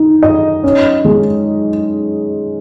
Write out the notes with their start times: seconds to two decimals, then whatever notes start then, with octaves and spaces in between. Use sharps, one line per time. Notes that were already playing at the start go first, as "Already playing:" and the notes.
Already playing: D#4
0.23 D#5
0.63 C#4
1.05 G#3